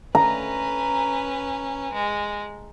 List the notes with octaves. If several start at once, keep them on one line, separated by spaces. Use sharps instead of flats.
C#4 B4 A#5
G#3